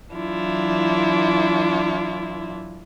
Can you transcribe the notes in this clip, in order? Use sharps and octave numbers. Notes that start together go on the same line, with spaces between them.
E3 F#3 D4 E4 F4